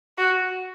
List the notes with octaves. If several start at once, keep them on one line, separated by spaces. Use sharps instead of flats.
F#4